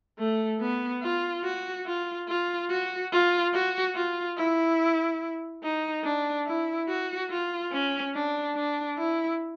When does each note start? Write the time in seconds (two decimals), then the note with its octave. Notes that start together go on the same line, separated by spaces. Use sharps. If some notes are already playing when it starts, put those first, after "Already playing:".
0.19 A3
0.60 B3
1.02 F4
1.44 F#4
1.86 F4
2.28 F4
2.70 F#4
3.11 F4
3.53 F#4
3.95 F4
4.38 E4
5.63 D#4
6.04 D4
6.47 E4
6.88 F#4
7.30 F4
7.72 C#4
8.14 D4
8.56 D4
8.98 E4